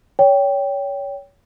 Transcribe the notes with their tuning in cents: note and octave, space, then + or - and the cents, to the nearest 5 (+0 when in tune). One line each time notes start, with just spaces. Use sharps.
C#5 +25 G5 +0